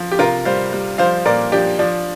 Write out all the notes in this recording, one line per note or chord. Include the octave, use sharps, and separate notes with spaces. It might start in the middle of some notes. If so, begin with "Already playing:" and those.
Already playing: F3
G4
C3 F4 A#4
G3 C5 F5
G3
F3 C5 F5
A#2 A#4 D5
F3 D4 G4
F3 D4